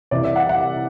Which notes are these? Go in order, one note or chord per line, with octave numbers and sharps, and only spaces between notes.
C2 C3 E3 D5
E5
F#5
F#5